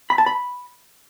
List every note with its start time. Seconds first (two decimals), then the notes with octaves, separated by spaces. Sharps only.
0.10 B5
0.18 A5
0.26 B5